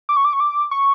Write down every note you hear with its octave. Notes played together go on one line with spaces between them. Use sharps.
D6
C#6
D6
C#6
D6
C#6